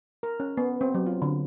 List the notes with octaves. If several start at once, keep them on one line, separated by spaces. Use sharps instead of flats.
A#4
C#4
B3
C4
F#3
F4
D3